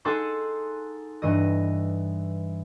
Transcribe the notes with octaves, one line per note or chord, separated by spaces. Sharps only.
D#4 G#4 A4 F#5 A5 C6
G2 E3 D#5